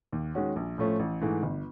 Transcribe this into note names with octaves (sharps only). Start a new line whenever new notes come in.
D#2
D#3 G#3 C#4 F#4
A#1
A2 F3 A3 C#4
A1
G#2 E3 A3
G1